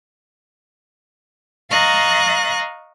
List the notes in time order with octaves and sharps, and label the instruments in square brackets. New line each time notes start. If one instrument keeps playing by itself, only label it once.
[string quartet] D#5 F5 A#5 C#6 F#6 A6